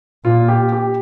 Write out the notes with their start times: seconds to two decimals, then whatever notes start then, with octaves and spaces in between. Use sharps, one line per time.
0.25 A#2 F4
0.48 G4
0.72 G4